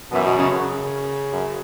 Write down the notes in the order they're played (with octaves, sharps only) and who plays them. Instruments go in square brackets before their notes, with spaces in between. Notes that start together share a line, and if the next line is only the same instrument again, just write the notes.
[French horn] F#2 [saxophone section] B2 E3
[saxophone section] B2
C#3
C#3
[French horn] F#2